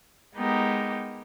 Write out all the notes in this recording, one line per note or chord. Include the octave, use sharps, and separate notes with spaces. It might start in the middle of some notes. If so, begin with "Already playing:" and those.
G#3 B3 D#4 G4 A#4